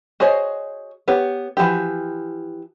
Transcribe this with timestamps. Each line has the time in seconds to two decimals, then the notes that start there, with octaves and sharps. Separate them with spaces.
0.20 F#4 G#4 C5 C#5 D#5
1.08 B3 G4 C#5
1.57 E3 F3 F#4 G4